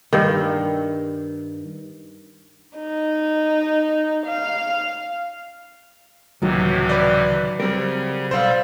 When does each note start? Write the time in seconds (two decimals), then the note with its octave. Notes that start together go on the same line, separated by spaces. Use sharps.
0.13 G2 D#3
2.78 D#4
4.26 F5
6.42 C#2 A2 C3 D#3 E3 F#3
6.89 B4 D5
7.60 C#3 G3 C4 A#4
8.31 B1 G3 A4 C5 D5 F5